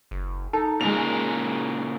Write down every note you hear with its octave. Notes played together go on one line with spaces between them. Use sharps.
F#1
D#4 A4
A#2 C#3 G#3 A#4 F7